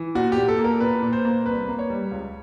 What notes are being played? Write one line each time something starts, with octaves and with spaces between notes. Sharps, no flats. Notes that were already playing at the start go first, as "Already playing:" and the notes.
Already playing: E3
A#2 F#4
G4
A#2
A4
A#3
A#4
A#2 B4
A#2
C5
A#3
C2 B4
A#3
C#5
G3
C#2